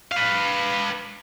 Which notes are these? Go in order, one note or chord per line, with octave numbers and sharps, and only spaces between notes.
B4 F5